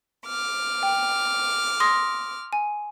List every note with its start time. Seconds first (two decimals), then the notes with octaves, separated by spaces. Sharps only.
0.26 D6 F6
0.83 G5
1.80 C6 D#6 A#6
2.53 G#5